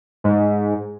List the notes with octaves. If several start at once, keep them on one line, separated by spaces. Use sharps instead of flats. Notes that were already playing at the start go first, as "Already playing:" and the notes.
G#2